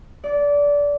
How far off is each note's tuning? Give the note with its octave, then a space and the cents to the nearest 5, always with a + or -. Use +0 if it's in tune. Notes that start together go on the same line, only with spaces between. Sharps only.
D5 -20